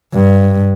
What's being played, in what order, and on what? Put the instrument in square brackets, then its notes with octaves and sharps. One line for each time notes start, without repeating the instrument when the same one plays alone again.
[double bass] G2